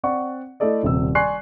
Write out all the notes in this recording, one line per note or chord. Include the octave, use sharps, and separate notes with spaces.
C4 D5 F#5 C#6
A3 E4 A4 D5 D#5
D#1 C3 E6
D5 G#5 C6 C#6 F#6 C7